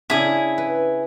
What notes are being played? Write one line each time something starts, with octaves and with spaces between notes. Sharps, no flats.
C#3 D4 E4 G#4
B4